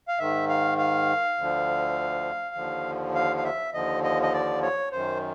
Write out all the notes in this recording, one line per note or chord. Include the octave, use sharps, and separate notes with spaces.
F5
G#2 D#3 E5
F5
F5
D2 D3 F3
D#2 D3 F3
F5
F5
E5
D#2 D3 F3 D#5
D#5
D#5
D5
C#5
F#2 D#3 C5